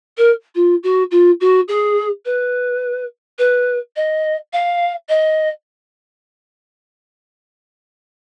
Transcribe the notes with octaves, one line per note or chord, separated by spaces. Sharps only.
A#4
F4
F#4
F4
F#4
G#4
B4
B4
D#5
F5
D#5